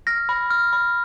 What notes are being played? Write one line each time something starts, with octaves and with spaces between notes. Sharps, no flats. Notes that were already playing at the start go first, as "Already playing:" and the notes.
F6 A#6
B5
F6
B5